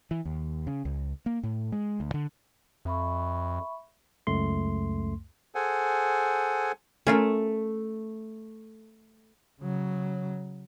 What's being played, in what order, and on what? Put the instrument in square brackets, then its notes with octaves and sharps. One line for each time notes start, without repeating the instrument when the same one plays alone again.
[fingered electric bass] E3
D#2
C#3
C#2
A#3
A2
G#3
D2
D3
[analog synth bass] F2 [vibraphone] E5 B5 C#6
[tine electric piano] C#2 F#2 A3 C6
[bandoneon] G#4 A4 C5 F#5 G#5
[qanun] A3 [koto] C#4 F4 A#4
[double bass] C#3 F#3